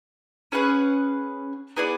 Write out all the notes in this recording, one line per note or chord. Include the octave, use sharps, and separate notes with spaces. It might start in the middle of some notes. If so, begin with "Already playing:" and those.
C#4 G#4 B4 F#5
B3 E4 G#4 D5